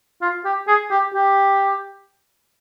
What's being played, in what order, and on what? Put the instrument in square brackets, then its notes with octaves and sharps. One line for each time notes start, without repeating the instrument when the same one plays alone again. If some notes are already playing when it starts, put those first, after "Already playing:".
[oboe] F4
G4
G#4
G4
G4